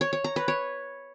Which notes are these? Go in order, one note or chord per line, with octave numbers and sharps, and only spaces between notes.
C#5
C#5
A#5
B4
C#5